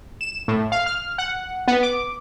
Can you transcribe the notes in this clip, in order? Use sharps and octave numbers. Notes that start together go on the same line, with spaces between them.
E7
A2
F5
F6
F#5
B3
D6